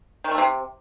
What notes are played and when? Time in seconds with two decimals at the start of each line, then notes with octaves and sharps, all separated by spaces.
0.24 D#3
0.31 A3
0.38 C3